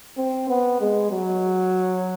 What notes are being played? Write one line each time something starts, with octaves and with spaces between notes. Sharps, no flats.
C4
B3
G#3
F#3